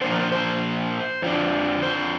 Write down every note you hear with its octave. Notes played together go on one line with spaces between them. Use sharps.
A#2 F3 A#3 D4 C5
A#4
C5
C5
F2 F3 D4
C5